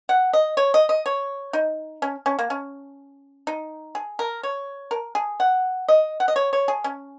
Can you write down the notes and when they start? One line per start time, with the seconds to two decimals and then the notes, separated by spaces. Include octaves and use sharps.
0.09 F#5
0.33 D#5
0.57 C#5
0.74 D#5
0.89 D#5
1.06 C#5
1.53 D#4
2.02 C#4
2.26 C#4
2.39 A#3
2.50 C#4
3.47 D#4
3.95 G#4
4.19 A#4
4.43 C#5
4.91 A#4
5.15 G#4
5.40 F#5
5.88 D#5
6.20 F#5
6.28 D#5
6.36 C#5
6.53 C#5
6.68 G#4
6.84 C#4